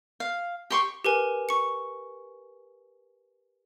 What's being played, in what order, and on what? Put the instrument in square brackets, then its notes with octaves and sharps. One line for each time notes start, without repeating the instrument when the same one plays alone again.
[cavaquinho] F5
G4 C6 C#6
[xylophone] G4 A#4 B4 G#5
C#6 C#7